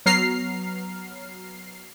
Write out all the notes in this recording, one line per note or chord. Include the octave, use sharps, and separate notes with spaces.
F#3 B3 A#5 F6 C7